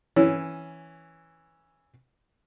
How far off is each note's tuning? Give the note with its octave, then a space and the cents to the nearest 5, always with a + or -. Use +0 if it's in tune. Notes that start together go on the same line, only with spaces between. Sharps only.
E3 +0 C#4 +0